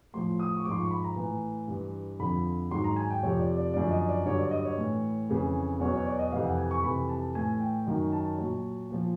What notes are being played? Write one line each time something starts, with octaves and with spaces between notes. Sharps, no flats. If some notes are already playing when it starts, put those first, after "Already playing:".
A2 F3 C6
D#6
C#6
G#2 F3 D6
C6
C#6
B5
A#5
A2 E3
G2 E3
F2 D3 F3 B5
G#2 D#3 F#3 C6
A#5
G#5
G5
F2 C3 F3 C#5
D5
D5
F#2 D3 F3 D5
D#5
D5
G2 D3 F#3 C#5
D5
D#5
C#5
A2 E3
F2 C#3 E3
E2 B2 F#3 C#5
C#5
D5
D#5
F2 C3 E3 F5
F#5
G#5
C#6
F2 C3 E3 B5
A5
A2 E3 G#5
G5
F#2 D#3 F#3
A5
A#2 F#3
A#2 F3